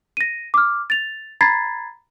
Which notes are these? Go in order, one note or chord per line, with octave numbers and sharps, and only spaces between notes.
A#6 D#7
D6 F6
A6 F7
A#5 B5 G#6 A6 B6 C7